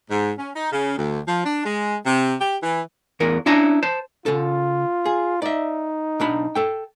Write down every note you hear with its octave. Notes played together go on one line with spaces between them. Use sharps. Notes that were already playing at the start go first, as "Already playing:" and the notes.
G#2
C#4
D#4
C#3
D2
F3
D4
G#3
C3
G4
E3
E2 E3 A#4
C#4 D4 E4 A5 A#5
C5 A5
C#3 F4 A4
G#4
D#4 D5 E5
B1 D4 B5
A4 G5